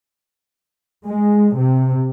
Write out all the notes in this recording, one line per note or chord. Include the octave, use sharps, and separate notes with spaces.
G#3
C3